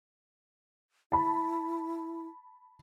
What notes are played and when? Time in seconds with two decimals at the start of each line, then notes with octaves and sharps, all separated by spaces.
1.12 E4 A5 B5